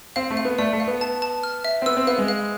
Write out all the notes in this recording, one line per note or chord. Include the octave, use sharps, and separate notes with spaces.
C4 F5
A3
F5
B3
A3 D5
A3
F5
B3
A5
A5
F6
E5
C4
B3 E6
C4
B3 F5
G#3
F5